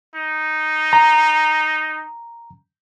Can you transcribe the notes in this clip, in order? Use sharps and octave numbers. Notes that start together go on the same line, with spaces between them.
D#4
A#5